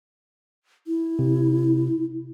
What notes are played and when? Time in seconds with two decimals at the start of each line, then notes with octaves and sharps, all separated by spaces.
0.87 E4
1.19 C3